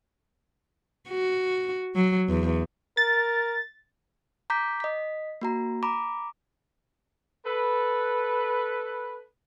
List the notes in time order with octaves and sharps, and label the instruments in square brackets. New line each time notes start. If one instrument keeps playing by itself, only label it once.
[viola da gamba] F#4
F#3
E2
[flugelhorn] A#4 [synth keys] A6
[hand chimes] A#5 D6 G6 B6
D#5 B6
A#3 F#4 A#5
A#5 B5 D6
[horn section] A4 B4